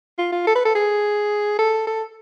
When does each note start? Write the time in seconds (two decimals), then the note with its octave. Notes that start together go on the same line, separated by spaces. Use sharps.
0.18 F4
0.32 F4
0.47 A4
0.55 B4
0.65 A4
0.75 G#4
1.58 A4
1.87 A4